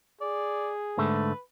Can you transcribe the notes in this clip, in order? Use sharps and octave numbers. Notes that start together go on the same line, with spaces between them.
G#4 D5
G#2 D3 A3 B4